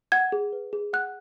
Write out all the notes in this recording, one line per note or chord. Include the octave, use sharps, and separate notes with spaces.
F#5 G#6
G#4
B4
G#4
F#5 F#6